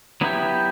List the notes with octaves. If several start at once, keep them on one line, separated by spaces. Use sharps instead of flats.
F#3 B3 E4 G4